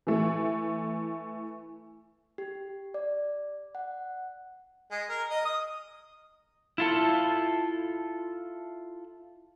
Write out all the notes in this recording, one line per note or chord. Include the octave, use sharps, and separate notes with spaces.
E3 A3
G4
D5
F#5
G#3
A#4
D#5
D#6
E4 F4 A4